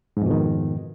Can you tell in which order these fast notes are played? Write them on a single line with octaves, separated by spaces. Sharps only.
G#2 F2 B2 D#3